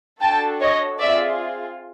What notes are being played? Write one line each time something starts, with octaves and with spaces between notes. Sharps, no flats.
D4 F#4 A4 G5 A5
C#5 D#5
C4 F4 G#4 D5 E5